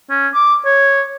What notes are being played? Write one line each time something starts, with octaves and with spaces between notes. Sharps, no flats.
C#4
D6
C#5